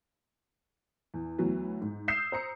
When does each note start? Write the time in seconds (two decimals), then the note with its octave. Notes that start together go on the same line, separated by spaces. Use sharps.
1.14 E2
1.38 D2 E3 F#3 B3
1.81 G#2
2.08 D#6 E6 G6 C7 E7
2.32 C5 A#5 C#7